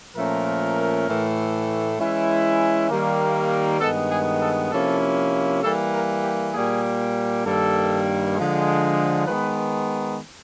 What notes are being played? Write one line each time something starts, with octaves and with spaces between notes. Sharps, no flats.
A#2 F3 A3 C#4 A#4
A2 E3 A3
E3 G#3 C#4 E4
D#3 G3 A#3
G2 D#3 G#3 B3 A4
G#4
A4
C3 F3 A#3 C#4 E4 A4
E3 G3 A#3 A4
A#4
G4
A#2 G3 A#3 G#4
G2 D#3 G3 A#3 A4
D3 F3 G#3
D#3 G#3 B3 B4